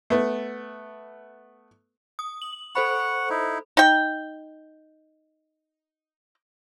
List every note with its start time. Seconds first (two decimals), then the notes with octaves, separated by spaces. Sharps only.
0.10 A3 B3
2.19 D#6
2.42 F#7
2.75 A4 C5 F#5 B5 C#6
3.30 D#4 E4
3.77 D#4 G5